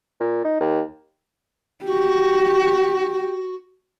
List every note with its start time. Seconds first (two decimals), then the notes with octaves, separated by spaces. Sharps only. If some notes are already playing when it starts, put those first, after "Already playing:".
0.20 A#2
0.45 D#4
0.61 D#2
1.85 F#4 G4